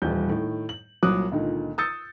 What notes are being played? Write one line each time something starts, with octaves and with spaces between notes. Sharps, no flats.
D#1 A1 G3 G6
A2 D#3
F#7
C2 A#2 F#3 D6 D#6 F#6
C#2 A#2 D3 D#3
D#6 E6 G6 A6 C#7